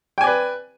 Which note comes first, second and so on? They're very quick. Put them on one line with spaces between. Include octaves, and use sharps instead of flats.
G5 G#5 D5 B4